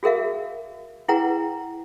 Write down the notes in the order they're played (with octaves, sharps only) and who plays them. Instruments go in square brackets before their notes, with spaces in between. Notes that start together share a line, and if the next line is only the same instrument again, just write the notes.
[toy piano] F#4 G#4 A#4 E5 F5
E4 G#4 B4 F#5 G5 A#5